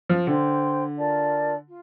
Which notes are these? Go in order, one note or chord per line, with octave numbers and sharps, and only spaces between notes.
F3
D3 C5 G5 C6
F4 A#4 D5 A5
F4